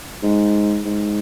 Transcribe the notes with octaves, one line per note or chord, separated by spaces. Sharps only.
G#2
G#2